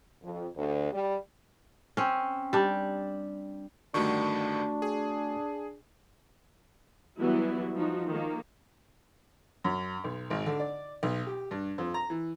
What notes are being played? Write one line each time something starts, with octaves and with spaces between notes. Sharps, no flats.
F2
D2
G3
C4 C#4
G3 D4
G2 D3 D#3 A3 D4 F#4 C#6
G#4
E3 F#3 G3 B3 E4 F#4
F3 D#4 F#4
D#3 A#3
F#2
B1
G#1
D3
D5
B1
G4
G2
F2
A#5
E3